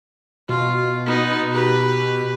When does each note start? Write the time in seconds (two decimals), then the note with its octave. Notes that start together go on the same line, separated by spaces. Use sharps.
0.49 B2 F4
1.06 B3 D#4
1.52 G4 B4